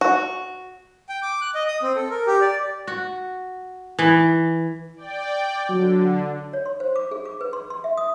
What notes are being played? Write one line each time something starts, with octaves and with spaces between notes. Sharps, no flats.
F#4
G5
D6
F#6
D#5
D#6
C4
A4
A#4
G4
D5
F#4
E3
D5 G5
D3 F#3
C#5
C6
C5
D6
G#4
D6
B4
C6
C6
E5
D#6